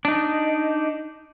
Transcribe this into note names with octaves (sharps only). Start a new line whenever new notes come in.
D4 D#4